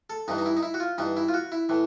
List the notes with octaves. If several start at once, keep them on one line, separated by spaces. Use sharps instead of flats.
A4
G2 E3 D#4
D#4
E4
D#4
E4
F#4
F4
G2 E3 D#4
E4
F4
F#4
E4
A2 E3